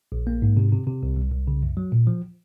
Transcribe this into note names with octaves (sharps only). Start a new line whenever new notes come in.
A#1
A#3
G#2
C3
C3
C3
C2
C2
C2
C#3
F#2
F#3
A#2
F3